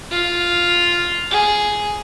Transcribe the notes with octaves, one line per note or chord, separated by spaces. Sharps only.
F4
G#4